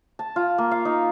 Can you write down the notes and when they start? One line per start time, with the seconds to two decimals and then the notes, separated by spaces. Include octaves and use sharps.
0.19 A5
0.36 F4
0.58 A#3
0.71 F5
0.85 D#4